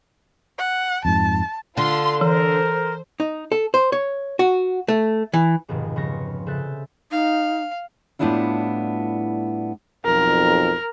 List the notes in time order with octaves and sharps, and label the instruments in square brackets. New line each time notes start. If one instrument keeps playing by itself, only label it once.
[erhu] F#5
[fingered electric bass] F2 G#2 [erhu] A5
[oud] D3 [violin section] F4 F5 C6
[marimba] E3 [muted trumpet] A#4 [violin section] C5
[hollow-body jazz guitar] D#4
A4
C5
C#5
F#4
A3
E3
[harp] F1 F2 G#2 B2 D#3
C#3 F3 B3 F4 C#6 A#6
C#3 A4 C5 E5 F#6 A6
[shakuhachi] D#4 [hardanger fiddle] F5
[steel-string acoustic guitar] A2 G3 B3 D4 E4 F4
[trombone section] B1 F2 [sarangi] A#4